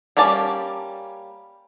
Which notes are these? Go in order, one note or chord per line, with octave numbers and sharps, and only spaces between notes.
G3 A#3 C#4 A5